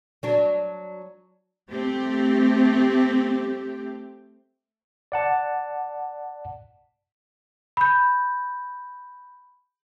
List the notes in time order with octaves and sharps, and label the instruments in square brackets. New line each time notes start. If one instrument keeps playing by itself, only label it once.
[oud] F#3 D4
[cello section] A3 C4 G4
[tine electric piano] D5 F#5 A5
[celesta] B5 G6